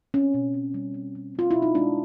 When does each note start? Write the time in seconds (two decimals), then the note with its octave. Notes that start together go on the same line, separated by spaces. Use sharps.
0.14 C4 C#4
0.34 B2
0.54 C4
0.74 G3
0.94 C4
1.15 G3
1.35 C4 F4
1.51 B2 E4
1.62 D#4
1.75 G#3 D4